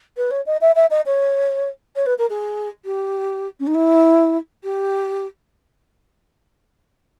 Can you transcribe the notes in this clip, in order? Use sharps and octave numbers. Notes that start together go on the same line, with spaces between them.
B4
C#5
D#5
E5
E5
D#5
C#5
C#5
B4
A#4
G#4
G4
C#4
D#4
E4
G4